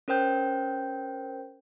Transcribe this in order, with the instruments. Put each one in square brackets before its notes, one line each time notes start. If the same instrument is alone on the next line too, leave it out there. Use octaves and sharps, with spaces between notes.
[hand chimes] C#4 A#4 C5 G5 G6